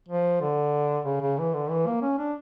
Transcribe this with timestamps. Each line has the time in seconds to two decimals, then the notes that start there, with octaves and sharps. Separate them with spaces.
0.08 F3
0.41 D3
1.05 C#3
1.21 C#3
1.38 E3
1.54 D3
1.70 E3
1.86 A#3
2.02 C#4
2.18 D4